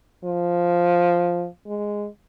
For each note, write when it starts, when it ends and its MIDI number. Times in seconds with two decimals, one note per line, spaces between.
0.24 1.47 53
1.66 2.06 56